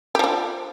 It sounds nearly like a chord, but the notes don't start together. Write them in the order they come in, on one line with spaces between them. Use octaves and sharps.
G4 F3 D4